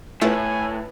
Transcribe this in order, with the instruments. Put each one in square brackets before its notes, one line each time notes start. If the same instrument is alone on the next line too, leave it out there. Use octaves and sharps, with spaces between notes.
[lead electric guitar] A2 [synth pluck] A3 E4 F4 [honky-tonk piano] B4 E5 [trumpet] G#5